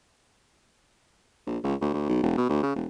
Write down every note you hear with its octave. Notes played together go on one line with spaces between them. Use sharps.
A#1
C#2
D2
D2
B1
E1
B2
D2
C#3
E1